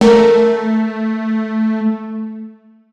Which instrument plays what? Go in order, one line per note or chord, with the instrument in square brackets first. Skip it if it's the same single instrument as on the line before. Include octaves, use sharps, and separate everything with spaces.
[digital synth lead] A3 [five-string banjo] A#4